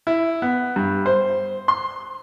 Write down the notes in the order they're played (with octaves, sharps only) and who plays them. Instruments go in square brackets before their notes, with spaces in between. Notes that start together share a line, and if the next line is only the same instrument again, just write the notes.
[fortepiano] E4
B3
G2
C5
C6